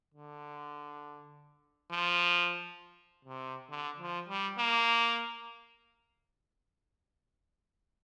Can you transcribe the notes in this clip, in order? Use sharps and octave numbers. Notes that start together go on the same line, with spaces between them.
D3
F3
C3
D3
F3
G3
A#3